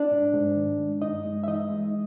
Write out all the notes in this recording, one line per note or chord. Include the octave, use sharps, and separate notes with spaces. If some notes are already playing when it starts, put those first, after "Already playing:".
Already playing: D4 D5
G#2
G#2
D#3
G#3
G2 D#4 D#5
G#3
E5
E3 D#4 D#5
G#3